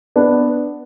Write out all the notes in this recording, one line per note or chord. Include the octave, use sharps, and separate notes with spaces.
B3 D4